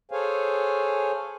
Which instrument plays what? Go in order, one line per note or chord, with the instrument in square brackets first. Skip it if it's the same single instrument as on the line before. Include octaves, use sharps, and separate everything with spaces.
[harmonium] G#4 A4 C5 C#5 F5 G#5